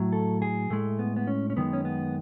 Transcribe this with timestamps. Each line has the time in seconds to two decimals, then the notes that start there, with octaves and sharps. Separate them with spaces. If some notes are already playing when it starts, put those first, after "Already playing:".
Already playing: A2 F#3
0.12 A4
0.42 G#4
0.70 A2 G#3 A3
0.99 B3
1.16 B3
1.27 C#4
1.50 C#4
1.56 F#2 D#3 G#3 B3
1.73 C#4
1.85 B3